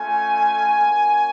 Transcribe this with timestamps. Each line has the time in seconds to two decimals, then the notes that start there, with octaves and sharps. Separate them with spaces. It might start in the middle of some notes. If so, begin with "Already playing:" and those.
Already playing: A3 C#4 F4 G#5
0.79 A#3 C#4 F#4